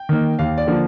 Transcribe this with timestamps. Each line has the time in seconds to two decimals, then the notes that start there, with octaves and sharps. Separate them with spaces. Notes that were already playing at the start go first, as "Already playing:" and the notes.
Already playing: G5
0.09 D#3 A#3
0.39 D#2 F5
0.58 D5
0.67 D3 F3 A#3